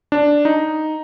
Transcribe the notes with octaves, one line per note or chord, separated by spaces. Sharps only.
D4
D#4